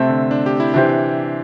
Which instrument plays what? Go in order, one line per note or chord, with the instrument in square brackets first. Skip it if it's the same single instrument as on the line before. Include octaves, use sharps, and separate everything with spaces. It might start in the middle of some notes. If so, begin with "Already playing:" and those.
Already playing: [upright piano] C3 A3 C4 A4
[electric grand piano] D3
D4
G4
E4
[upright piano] C3 E3 C4 G4 C5 [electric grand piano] D4